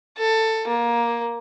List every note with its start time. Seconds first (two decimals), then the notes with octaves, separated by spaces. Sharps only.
0.19 A4
0.68 A#3